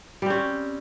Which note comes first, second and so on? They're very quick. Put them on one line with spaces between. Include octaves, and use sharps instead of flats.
G3 C4 C#4